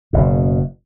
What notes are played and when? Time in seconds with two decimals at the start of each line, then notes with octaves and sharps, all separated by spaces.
0.13 F#1 B2